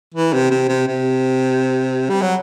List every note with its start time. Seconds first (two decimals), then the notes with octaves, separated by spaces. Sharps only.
0.14 E3
0.33 C3
0.51 C3
0.69 C3
0.88 C3
2.09 G3
2.22 F#3